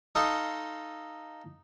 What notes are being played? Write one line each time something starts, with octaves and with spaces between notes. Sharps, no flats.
D#4 A4 F5 C6 C#6 D#6